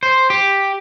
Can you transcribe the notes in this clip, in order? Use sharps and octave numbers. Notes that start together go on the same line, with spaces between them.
C5
G4